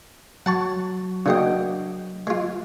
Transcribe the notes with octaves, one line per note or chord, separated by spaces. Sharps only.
F#3 F#5 A5 C#6
C#3 A#3 D4 F#4 D#5 G5
G#3 F4